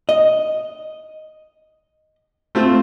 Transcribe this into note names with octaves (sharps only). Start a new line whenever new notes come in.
D#5
A3 C4 F4